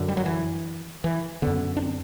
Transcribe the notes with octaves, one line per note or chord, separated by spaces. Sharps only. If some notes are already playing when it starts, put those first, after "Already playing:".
Already playing: F#2 D3
G3
F#3
E3
E3
F#2 D3 B3
D4
C4